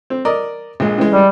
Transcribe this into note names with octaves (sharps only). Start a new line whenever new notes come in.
C4
A#4 D5 D#5
A#1 G#3
C#3 E3 G#3
G3